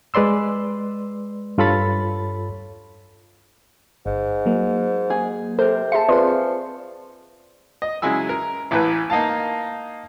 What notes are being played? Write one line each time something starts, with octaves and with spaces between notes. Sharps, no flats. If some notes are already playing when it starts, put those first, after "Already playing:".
G#3 B4 D5 C6 E6
G2 F4 A4 C#5 B5 A6
G1 G#2
F#3 A#3
G#4
C3 A4 A#4 C5
G#4 E5 A5 C6 C#7
F3 C4 F4 G#4 B4 D5 C6
D#5
C#3 F#3 G#3 E4 G#5 E6
A#4
A1 A2 E3 B4 F#6
A#3 D#4 F5 A5